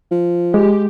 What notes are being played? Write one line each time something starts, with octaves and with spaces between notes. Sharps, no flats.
F3
G#3 G4